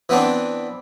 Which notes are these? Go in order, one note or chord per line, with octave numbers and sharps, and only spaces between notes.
E3 B3 C4 D4